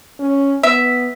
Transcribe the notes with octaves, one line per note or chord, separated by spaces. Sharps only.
C#4
B3 E5